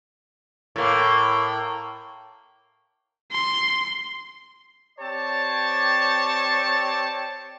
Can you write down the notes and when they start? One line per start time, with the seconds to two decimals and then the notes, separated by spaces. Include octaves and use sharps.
0.76 A2 A#3
3.32 C6
4.99 C4 G4 C#5 D5 A5